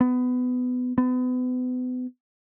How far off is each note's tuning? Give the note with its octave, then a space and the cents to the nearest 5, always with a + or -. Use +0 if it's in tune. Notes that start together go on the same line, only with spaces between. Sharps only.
B3 +20
B3 +35